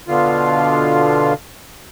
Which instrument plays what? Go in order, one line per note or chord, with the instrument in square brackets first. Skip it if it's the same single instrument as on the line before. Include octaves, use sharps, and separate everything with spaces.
[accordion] B2 D3 F4